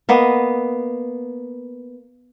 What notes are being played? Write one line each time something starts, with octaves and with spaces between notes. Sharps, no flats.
A#3 B3 D#5